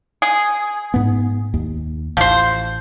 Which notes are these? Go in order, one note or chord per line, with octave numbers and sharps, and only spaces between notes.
G#4
G#2 B3
D#2
A1 F3 C5